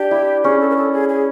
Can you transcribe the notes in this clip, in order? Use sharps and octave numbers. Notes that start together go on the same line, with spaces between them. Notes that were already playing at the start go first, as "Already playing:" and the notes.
Already playing: D4 G4
E4
C#4 G#4
A4
A#4
A4
G#4
G#4